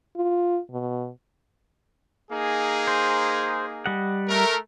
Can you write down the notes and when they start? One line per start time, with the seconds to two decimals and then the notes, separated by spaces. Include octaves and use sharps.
0.16 F4
0.71 B2
2.30 A#3 D#4 G#4
2.87 C5
3.86 G3 D#5 F#5
4.28 A3 A#4